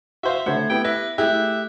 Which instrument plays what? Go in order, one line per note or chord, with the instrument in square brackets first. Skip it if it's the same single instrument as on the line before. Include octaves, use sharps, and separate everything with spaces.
[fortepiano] F#4 C5 F5 [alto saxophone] E5
[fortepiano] D3 C5 C#5 [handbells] A3 G#6 [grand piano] F#5
[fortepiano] B3 E4 [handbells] G4 [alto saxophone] G5
[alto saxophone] B4 [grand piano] E5 [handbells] A#6
[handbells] A3 F#6 [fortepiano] E4 G#4 [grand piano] G4 [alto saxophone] E5